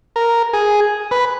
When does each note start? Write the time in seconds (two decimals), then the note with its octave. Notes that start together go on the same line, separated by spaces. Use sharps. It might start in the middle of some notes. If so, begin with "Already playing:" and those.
0.16 A#4
0.53 G#4
1.11 B4